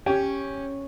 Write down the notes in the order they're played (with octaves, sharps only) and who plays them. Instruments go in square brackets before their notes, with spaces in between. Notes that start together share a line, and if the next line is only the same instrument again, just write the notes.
[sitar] C#4 [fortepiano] G4